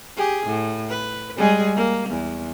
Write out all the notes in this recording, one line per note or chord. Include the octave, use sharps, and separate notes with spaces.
G4 G#4
A2
B4
G3 G#3 G#4
A#3
E2